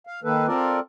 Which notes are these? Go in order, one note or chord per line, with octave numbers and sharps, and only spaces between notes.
F5
D#3 A#3 A4 B4
C4 F4 A4 A#4 D5